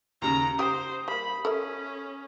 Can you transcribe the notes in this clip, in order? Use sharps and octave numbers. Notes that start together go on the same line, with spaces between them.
D#2 C#3 A#5
G4 C5 G5 D#6
G3 A#3 B5
C#4 A4 A#4 E5